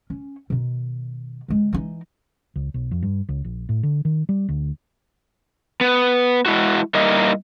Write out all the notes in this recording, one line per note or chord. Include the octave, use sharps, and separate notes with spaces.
C#4
B2 D#3
D3 G#3
E3 D#4
C#2
B1
F2
G2
C#2
A#1
A2
D3
D#3
G3
D2
B3
G#3 E4 F#4
G3 A#3 D#4 E4 D#5